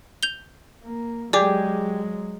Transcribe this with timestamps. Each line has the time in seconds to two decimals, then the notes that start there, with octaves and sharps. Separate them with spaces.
0.23 G6 F7 G7
0.83 A#3
1.33 F#3 G#3 G4 G#4 D5 D6